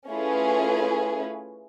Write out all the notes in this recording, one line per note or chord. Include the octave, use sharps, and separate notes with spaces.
A3 C#4 E4 F4 G#4 B4